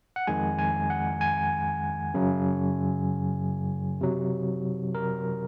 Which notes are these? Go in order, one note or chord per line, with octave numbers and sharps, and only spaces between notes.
F#5
F2 D#3 G#3 G#5
G#5
F#5
G#5
F#2 C#3 F#3
C3 F#3
A#4